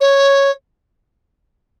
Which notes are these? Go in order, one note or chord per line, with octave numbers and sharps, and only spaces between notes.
C#5